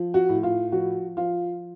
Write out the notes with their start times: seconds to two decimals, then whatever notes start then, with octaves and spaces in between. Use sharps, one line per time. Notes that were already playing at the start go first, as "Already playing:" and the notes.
Already playing: F3
0.14 F#4
0.29 A2
0.43 F4
0.72 F3 F#4
1.17 F3 F4